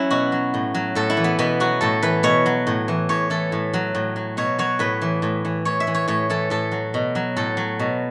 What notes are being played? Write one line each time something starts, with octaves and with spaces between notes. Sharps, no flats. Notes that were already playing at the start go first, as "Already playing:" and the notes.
Already playing: F#3 C#4 E4
B2 F#4
F#3
A2
F#3
A2 A4
E4
E3
B3
B2 B3
F#3 F#4
A2 A4
E3 B4
B2 C#5
F#3
A2
E3
A2 C#5
E3 A4
A2
F#3
A2
F#3
B2 C#5
F#3 C#5
A2 B4
E3
A2
E3
A2 C#5
E5
E3
C#5
A2 C#5
E3 A4
A2 A4
F#3
B2
F#3
A2 A4
F#3
B2